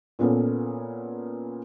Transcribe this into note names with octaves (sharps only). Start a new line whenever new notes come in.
A#2 B3 C#4 A4